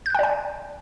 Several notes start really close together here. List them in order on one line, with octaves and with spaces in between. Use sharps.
G6 F#6 G5 D5 G#5